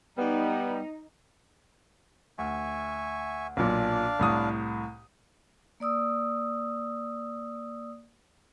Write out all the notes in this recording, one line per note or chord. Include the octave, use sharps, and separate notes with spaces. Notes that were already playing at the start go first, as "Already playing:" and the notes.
G3 B3 D#4
D2 E5 G#5 C#6
B1 A#2 D4 D5 F5
C2 A2 D#6
A#3 D5 D#6 E6